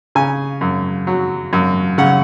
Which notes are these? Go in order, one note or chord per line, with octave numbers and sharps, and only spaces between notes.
C#3 G#5
F#2
F#3
F#2
C#3 F#5